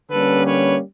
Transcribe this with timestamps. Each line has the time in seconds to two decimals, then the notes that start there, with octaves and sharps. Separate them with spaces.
0.11 D3 G3 A#3 C#4 A4 B4
0.45 B4 C#5